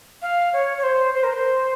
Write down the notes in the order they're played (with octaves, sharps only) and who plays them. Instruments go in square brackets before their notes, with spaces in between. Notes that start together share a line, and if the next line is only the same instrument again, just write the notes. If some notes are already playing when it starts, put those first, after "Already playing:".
[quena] F5
C#5
C#5
C5
C5
A#4
C5